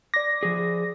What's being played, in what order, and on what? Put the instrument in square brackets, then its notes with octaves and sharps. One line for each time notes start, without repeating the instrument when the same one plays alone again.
[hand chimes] D5 D6 [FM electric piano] A#6
[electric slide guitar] F3 G#4